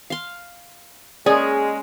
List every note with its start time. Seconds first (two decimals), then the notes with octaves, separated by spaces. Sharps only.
0.10 F5 C6
1.26 G#3 A#3 C#4 G#4 D5